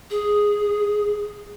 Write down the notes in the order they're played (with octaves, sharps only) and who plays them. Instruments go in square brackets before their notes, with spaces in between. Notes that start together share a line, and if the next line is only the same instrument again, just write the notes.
[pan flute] G#4